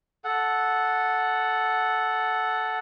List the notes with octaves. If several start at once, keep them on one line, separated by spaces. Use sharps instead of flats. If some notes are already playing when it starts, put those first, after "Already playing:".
A4 F#5